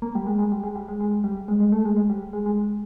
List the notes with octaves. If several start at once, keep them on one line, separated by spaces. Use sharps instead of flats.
A#3
G3
G#3
G#3
G3
G#3
G3
G#3
G#3
G3
G#3
G#3
A3
G#3
G#3
G3
G#3
G#3